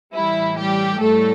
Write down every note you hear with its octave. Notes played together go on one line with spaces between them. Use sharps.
A2 E3 G3 E4
G3 G4
A2 G3 A3 A4